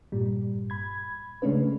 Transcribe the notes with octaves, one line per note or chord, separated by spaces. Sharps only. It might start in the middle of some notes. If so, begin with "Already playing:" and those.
G2 A#2 G3
B5 G#6
C#3 G#3 A3 C#4 D4 B4